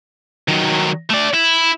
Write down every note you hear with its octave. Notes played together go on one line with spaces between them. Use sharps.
D#3 F#3
A3 D5
E4